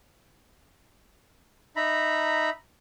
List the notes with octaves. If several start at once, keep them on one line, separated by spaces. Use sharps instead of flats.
D#4 E5 A#5 B5